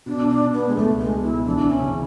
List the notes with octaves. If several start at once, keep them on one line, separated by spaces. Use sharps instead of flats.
B2 D4
D4
B2
B3
G#3
C#2 A3
G#3
B2
E4
E3 D4
C#4
C#3